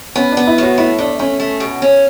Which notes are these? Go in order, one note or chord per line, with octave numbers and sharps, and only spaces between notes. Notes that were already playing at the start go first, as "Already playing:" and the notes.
B3 C#4
B3 D4
E4
A2 F#4
A3 E4
A3 D4
A3 C#4
A3
B2
C#4